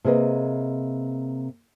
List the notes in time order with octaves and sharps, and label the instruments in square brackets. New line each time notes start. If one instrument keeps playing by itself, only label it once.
[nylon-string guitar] C3 A#3 G#4 B4 D#5